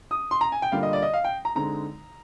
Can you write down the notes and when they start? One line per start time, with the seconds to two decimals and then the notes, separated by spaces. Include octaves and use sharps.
0.11 D#6
0.31 C6
0.41 A#5
0.52 G#5
0.62 G5
0.72 D3 G3 A#3 F4 F5
0.83 D#5
0.93 D5
1.02 D#5
1.14 F5
1.24 G5
1.45 A#5
1.55 D3 G#3 C4 D#4 A#5